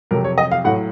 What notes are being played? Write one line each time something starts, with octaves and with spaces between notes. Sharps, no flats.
F2 C3 F#3 A#4
C#5
D#5
F5
A2 F#3 F#5